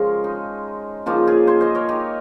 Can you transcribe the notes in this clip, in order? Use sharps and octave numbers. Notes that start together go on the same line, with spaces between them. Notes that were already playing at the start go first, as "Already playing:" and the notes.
Already playing: C#3 F3 G#3 C#4 F4 A#4
D#4
C#3 F3 A#3 D#4 F4
F4 G#4
G#4 C5
C5 D#5
A#4 C#5
D#4 G4